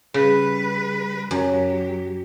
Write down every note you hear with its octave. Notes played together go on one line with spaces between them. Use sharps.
C#3 G3 B4
F#2 F#3 G4